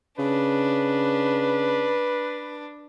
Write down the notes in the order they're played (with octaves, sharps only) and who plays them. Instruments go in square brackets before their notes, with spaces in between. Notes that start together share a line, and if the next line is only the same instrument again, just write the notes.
[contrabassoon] C#3 [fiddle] D4 [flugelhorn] B4